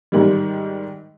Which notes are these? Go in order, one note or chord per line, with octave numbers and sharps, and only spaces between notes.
G#2 D#3 G3